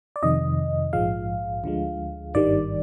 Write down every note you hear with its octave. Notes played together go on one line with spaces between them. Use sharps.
D5
F2 C3 D#3 D#5
A#1 G#2 F3 G#3 F5
D2 D3 F3 G#3
G#1 G2 D#3 G3 D5